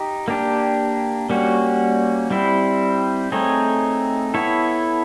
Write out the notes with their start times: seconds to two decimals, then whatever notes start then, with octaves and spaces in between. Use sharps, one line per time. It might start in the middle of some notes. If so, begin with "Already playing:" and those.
Already playing: D#4 G4
0.28 A#3 D4 G4
1.30 G3 A#3 C#4 F#4
2.30 G3 C4 E4
3.32 A3 C4 D#4 G#4 C#5
4.34 B3 E4 A4 C#5